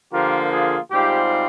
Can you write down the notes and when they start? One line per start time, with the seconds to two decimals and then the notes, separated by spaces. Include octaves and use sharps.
0.12 D3 F3 A#3 F4 G4 A#4
0.51 F4 G#4
0.91 G#2 G3 C4 F4 G4